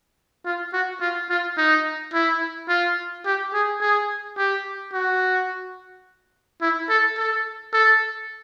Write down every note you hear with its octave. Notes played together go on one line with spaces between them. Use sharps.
F4
F#4
F4
F4
D#4
E4
F4
G4
G#4
G#4
G4
F#4
E4
A4
A4
A4